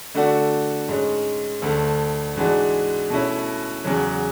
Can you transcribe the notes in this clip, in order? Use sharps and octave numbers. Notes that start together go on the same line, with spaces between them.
D3 A3 D4 F#4
G#2 G#3 C#4
D2 D3 A3
G#2 E3 G#3 D4 F#4
B2 A3 C#4 E4
E2 C#3 F#3